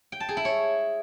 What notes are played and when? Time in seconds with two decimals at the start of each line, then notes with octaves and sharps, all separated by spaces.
0.12 G5
0.20 A5
0.29 G#4
0.37 E4
0.45 C#5